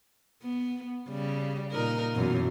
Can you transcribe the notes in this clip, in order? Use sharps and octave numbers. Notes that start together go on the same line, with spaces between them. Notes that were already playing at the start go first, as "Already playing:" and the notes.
B3
C#3 G3
A#2 D#4 A#4
F#2 B2 E3